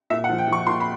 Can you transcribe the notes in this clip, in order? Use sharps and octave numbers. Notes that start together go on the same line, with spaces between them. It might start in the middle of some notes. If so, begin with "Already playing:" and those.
A#2 E5
F#5
F3
G5
F3
C#6
A#2 C6
B5